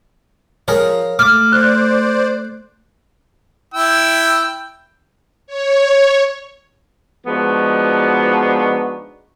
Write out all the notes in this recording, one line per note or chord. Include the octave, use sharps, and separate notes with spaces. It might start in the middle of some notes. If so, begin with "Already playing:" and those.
F3 G#4 A#4 C#5
A3 D6 F6
C5 D5 F#6
E4 G5 E6
C#5
F3 G#3 B3 D4 D#4 F#4